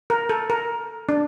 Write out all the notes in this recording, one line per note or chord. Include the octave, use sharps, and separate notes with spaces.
A#4
A4
A#4
D4